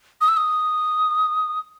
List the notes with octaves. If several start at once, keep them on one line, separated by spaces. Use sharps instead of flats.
D#6
E6
D#6